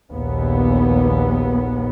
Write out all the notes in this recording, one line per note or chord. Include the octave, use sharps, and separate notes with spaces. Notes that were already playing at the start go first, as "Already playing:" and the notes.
A#1 D#2 B3